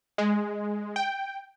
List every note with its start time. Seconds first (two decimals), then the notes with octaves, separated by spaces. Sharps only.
0.18 G#3
0.96 G5